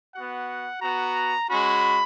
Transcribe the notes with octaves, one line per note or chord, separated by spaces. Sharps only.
B3 F#4 F#5
B3 F#4 A#5
G#3 C#4 F#4 B5